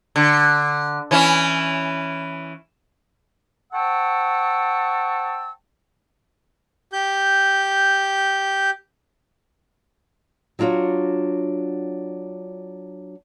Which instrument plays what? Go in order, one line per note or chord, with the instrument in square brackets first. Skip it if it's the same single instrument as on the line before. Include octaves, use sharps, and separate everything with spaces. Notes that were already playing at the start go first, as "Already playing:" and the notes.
[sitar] D3
E3 C#4 E4
[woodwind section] C5 F#5 G5 A5 C#6 E6
[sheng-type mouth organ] G4 G6
[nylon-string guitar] F#3 D4 F4 F#4 C#5